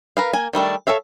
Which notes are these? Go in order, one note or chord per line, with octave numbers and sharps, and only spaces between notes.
A#4 B4 F5
A#3 G#5
D#3 G3 A3 D4
A4 C#5 E5 F5